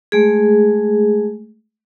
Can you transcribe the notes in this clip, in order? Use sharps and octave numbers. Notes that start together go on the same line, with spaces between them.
G#3 A3 G#4